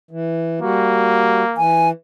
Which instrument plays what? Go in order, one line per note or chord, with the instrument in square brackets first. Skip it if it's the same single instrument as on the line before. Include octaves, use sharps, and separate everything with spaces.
[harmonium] E3
[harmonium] G3 F#4 [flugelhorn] A#3
[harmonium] E3 [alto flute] G#5